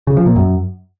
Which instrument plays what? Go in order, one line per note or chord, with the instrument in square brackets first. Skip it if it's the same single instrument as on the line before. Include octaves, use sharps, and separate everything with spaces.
[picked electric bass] C#3
F3
A#2
F#2